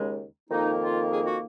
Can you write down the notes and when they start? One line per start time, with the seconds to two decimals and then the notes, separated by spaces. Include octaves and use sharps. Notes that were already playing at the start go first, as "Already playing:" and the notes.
Already playing: D#2 C#3 G#3
0.50 F2 D#3 A#3 D#4
0.81 F4
1.11 G#4
1.26 F#4